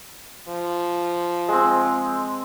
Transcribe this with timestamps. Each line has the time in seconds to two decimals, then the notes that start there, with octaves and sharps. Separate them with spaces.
0.48 F3
1.48 G#3 C4